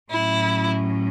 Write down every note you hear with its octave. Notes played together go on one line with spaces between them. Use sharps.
A2 F#3 C#4 E4